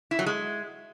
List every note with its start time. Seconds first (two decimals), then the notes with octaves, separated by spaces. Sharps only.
0.11 E4
0.19 F#3
0.26 G#3